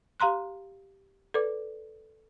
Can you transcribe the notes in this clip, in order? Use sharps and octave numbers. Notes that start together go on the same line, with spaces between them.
G4 F5 A#5 C6 F#6
A4 B4 D5 D6